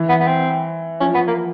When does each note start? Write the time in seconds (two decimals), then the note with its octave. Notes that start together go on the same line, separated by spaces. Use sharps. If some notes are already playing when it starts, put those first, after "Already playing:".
Already playing: E3
0.09 B3
0.20 B3
0.27 C4
1.00 F3 C#4
1.15 B3
1.28 A#3